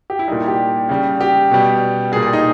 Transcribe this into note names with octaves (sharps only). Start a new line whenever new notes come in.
G4
E4
A#2 G3 D#4
E4
G4
C#3 G3
G4
B2 G3
A#2 G3 G#4
G#4
D#4